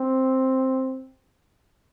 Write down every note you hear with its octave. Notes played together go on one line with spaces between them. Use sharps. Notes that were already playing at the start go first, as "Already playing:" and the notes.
Already playing: C4